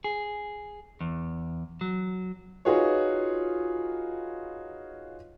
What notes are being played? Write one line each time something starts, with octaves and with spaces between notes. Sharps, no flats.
G#4
E2
F#3
D#4 F4 F#4 G#4 B4 C#5